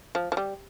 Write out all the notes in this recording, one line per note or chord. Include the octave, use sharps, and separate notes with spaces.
F3
F3
G3